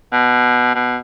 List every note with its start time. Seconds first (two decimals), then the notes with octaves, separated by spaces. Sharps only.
0.13 B2
0.75 B2